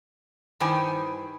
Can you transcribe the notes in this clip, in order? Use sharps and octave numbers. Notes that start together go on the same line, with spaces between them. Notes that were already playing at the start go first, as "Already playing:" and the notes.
G2 D#3 E4 C5 G5 G#5